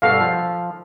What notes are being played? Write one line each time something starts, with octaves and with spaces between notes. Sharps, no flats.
G2 B2 F#4 A4 F5
F3